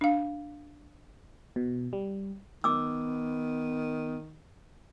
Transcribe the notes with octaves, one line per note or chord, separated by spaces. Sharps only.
D4 F5
B2
G3
D#3 B3 D6 E6